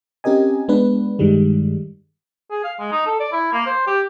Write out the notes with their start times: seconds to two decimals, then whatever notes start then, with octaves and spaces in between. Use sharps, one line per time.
0.24 C4 C#4 G4 A#4 D#5 G#5
0.68 G#3 B3 D4 B4
1.19 G2 D#3 G3 G#3
2.51 G#4
2.64 F5
2.79 G#3
2.92 D#4
3.06 A4
3.20 D5
3.32 E4
3.52 A#3
3.66 C5
3.87 G4